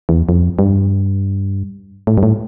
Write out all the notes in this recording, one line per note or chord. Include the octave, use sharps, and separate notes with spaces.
E2
F2
G2
A2
G2
A2